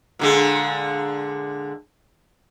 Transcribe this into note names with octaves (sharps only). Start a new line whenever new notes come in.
A#2 D3 G#3